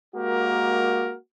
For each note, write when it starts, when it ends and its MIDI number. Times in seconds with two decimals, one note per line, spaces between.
0.15 1.15 56
0.15 1.15 58
0.15 1.15 66
0.15 1.15 67
0.15 1.15 70